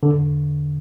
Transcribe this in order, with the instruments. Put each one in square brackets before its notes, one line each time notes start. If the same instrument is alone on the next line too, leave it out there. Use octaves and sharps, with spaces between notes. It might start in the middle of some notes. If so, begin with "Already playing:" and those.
[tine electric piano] D3